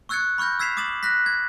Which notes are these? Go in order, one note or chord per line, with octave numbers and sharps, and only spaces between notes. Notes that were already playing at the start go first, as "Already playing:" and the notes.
C#6 E6 F#6 G#6 A6 C#7
B5 C#6 F6 G6 A#6
E6 G#6 B6 C7 E7 F7
D6 D#6 A6 E7 F#7
F#6 A#6 B6
G#6